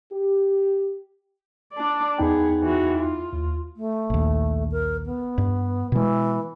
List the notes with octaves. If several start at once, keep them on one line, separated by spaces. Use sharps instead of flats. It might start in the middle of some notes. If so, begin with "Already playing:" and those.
G4
D4 D5
E2 B3 D#4 G#4 G5
E3 F#4
F4
D#2
A3
A#1 D#2
A#4
B3
G2
B2 E3 G#3